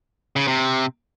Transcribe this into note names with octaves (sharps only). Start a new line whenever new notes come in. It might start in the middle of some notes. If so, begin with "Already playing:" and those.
C#3
C3